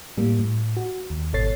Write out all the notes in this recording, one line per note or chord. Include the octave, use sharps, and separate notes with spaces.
A2 G3 A#3
A2
F#4
D#2
G#1 B2 A4 C#5 A6 C7